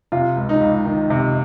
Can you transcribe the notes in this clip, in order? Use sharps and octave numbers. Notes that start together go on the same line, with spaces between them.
C3 F4
C#2
D#4
C#2
D#3
C3